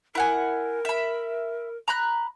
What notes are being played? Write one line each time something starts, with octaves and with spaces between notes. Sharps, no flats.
E4 A#4 F#5 G#5
E5 B5
A#5 B5 F#6